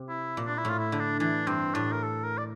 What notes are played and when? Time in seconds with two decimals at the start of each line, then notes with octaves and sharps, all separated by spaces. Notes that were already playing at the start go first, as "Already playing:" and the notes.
Already playing: C3
0.09 E4
0.37 A#2
0.46 D4
0.58 E4
0.65 A2 F4
0.79 E4
0.92 D3
1.00 D4
1.19 E3 D4
1.47 G2 C4
1.75 A2 D4
1.92 A#4
2.03 A4
2.23 A#4
2.38 D5